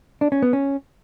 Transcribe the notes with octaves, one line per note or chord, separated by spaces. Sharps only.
D4
C#4
B3
C#4